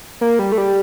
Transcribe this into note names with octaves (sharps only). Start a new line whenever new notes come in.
A#3
G3
A3
G3